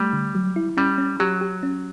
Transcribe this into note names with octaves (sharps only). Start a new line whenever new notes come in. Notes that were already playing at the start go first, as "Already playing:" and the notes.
Already playing: G3 A3
D3
F#3
E4
G3 C#4
C#4
F#3 G4
G4
C#4